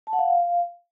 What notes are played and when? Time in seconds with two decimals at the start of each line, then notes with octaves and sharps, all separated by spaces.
0.07 A5
0.13 F#5
0.19 F5